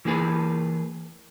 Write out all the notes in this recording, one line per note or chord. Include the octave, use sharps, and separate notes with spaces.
E3 A#3 G#4 B4